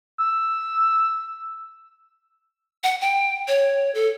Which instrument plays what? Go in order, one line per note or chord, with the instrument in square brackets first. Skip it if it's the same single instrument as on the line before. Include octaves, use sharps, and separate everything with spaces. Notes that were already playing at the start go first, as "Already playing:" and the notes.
[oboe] E6
[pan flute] F#5
G5
C#5
A4